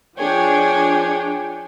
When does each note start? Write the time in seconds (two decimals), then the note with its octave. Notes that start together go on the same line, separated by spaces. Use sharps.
0.18 F3 D4 G#4 C#5 G5